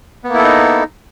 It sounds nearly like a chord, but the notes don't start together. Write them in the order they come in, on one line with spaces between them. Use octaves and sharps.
B3 A#3 E4 A4 D#4